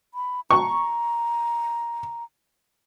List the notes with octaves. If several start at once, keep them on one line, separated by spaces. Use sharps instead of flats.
B5
A#5 C#6